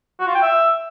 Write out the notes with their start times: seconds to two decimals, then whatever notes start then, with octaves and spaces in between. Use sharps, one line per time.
0.20 F#4
0.27 F4
0.35 G5
0.43 E5